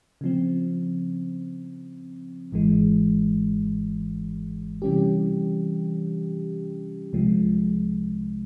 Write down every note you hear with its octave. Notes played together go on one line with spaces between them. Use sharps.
C#3 F3 C4
G#1 G#2 E3 G#3
C3 E3 G3 C#4 G4
C2 C3 F3 G#3